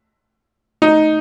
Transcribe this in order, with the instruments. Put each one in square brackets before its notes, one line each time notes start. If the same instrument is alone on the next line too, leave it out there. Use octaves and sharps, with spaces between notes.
[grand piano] D#4